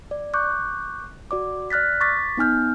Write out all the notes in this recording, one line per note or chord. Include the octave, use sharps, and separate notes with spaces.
D5
C#6 D6 F#6 G6
F#4 D5 D6
D5 F6 F#6 A6 B6
C#6 D6 A6 B6
B3 D#4 G#5 F6 G6